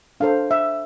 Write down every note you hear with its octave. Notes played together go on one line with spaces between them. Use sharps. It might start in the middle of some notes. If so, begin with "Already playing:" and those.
D4 A4 C5 F5
E5